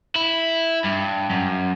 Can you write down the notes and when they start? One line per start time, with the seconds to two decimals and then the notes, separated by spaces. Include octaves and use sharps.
0.16 E4
0.85 G2
1.31 F#2